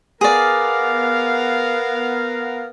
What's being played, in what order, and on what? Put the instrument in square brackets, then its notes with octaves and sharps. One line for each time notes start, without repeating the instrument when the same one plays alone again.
[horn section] B3 A#4 F5 [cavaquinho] G#4 D5